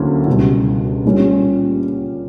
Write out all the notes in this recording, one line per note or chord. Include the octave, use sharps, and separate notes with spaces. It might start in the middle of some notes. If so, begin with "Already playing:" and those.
Already playing: D2 D3 F#3 A#3 C#4 E4
C#2 B2 G3
A#2 G3 C#4